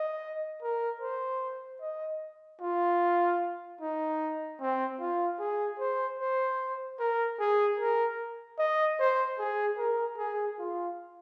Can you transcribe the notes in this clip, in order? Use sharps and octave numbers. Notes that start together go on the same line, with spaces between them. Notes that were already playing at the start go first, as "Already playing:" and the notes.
Already playing: D#5
A#4
C5
D#5
F4
D#4
C4
F4
G#4
C5
C5
A#4
G#4
A#4
D#5
C5
G#4
A#4
G#4
F4